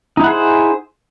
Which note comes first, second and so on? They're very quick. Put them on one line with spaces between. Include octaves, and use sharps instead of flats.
D#4 E4 F#5 G#4 C5